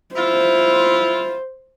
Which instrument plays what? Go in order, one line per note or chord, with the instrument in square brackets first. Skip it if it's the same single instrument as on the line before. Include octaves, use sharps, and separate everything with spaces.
[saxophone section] E4 F4 [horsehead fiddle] C5